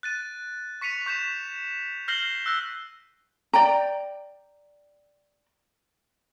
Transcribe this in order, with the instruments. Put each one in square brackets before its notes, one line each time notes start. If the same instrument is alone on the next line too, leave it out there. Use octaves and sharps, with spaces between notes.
[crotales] F#6 A6 D#7
C#6 B6 C#7 D#7 F7
C#6 G6 B6 E7
F6 G6 A#6 C7 F#7 G7
E6 F#6 A#6
[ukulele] D5 G5 A#5